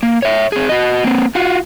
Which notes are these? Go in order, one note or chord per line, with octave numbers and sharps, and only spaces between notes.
A#3
C#5 E5
C4 G#4
F#4 D#5
A#3 C4
F4 F#4